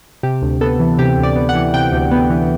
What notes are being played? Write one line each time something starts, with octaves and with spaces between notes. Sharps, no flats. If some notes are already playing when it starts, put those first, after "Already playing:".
C3 G4
D2
B3 A4
E3
C3 G4
D2
D5
B3
F#5
E3
C3 G5
D2
B3
E3